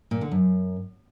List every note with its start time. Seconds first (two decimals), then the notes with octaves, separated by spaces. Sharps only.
0.11 A#2
0.21 D3
0.32 F#2